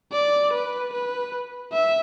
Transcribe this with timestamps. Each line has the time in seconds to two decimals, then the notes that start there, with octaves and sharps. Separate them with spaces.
0.13 D5
0.53 B4
0.93 B4
1.72 E5